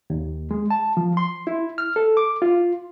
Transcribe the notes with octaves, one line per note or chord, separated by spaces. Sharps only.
D#2
G#3
A5
F3
C6
E4
F6
A4
D6
F4